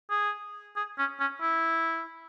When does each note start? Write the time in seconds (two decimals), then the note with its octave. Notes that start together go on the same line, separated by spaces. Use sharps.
0.10 G#4
0.76 G#4
0.98 C#4
1.20 C#4
1.41 E4